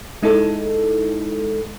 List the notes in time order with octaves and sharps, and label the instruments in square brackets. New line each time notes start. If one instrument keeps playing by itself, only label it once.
[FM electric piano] G#3 D#4 E4 A4